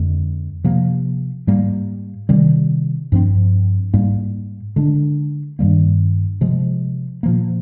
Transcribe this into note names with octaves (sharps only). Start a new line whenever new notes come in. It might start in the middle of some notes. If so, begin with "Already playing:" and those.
Already playing: F2 D3 G#3
C3 F3 A#3
G#2 G3 A#3
C3 D#3 G3 C4
G2 F3 C4
G#2 G3 A#3
D3 G#3 D4
G2 D#3 G3 A#3
C3 F3 G#3
A#2 F3 A#3